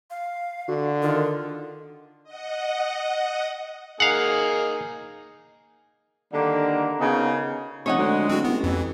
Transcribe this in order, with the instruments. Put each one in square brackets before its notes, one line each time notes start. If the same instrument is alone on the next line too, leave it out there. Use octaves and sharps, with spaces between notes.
[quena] F5
[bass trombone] D3 [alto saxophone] F#4
[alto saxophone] D#3 [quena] F4
[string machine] D#5 F#5
[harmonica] A#3 D#4 G#4 [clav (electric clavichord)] F5 F#5
[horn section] D3 D#3 G3 A#3
C#3 B3 D#4 F#4 A#4
[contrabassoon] F1 [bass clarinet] C#4 [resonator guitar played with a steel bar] C#5 D#5 F#5
[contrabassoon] D2 [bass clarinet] G#3
[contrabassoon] D1 [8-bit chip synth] C4 F#4
[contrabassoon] A1 [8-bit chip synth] B3
[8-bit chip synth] F2 [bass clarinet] E3